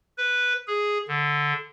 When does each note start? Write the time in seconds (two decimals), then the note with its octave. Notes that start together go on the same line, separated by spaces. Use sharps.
0.17 B4
0.67 G#4
1.08 D3